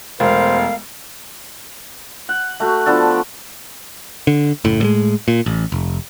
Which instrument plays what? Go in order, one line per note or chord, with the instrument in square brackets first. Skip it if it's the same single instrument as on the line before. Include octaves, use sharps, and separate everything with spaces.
[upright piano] E1 [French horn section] A3 B3 A#4 [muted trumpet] C5 [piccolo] F5
[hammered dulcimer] F#5
A3 F#4
F3 B3 D4 A4
[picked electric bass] D3
F#1 A2
A2 G3 G#3
A#2
A1
F1